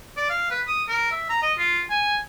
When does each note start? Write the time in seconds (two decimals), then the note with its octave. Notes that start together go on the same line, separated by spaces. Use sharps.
0.17 D5
0.30 F5
0.50 B4
0.67 D#6
0.89 A#4
1.12 E5
1.30 A#5
1.43 D#5
1.59 F4
1.90 G#5